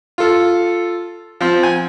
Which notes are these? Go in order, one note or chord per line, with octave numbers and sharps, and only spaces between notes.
F4 A4
F3 C4
G#5